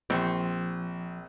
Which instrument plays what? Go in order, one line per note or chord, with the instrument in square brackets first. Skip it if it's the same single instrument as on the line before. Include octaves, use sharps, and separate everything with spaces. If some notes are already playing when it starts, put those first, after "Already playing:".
[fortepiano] A#1 [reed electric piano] F3 [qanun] C4 C#6